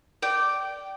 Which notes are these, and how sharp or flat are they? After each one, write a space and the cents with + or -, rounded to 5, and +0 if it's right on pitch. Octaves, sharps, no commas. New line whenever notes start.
D5 +0 G5 -20